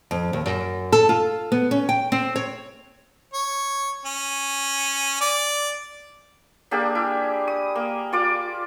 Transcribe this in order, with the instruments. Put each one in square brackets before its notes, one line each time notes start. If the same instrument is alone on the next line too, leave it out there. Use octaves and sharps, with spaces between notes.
[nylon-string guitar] F2
D#2
F#2
A4
F4
B3
C#4
G5
C4
C#5
[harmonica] C#5
C#4
D5
[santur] A#3 D4 G4 G#4
E4
D#6
A#3
F4 D5 D6